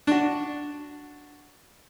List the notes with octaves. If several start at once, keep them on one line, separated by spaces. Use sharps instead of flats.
D4 F#4